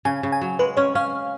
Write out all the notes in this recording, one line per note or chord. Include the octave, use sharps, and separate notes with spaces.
C#3 G#5
C#3
G#5
F#3
G#3 B4
C#4 C#5
C#4 F5